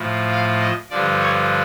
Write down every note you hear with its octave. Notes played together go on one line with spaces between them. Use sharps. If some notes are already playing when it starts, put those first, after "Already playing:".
Already playing: A2 F3
F5
D#5
G2 D3 F3 D5
C#5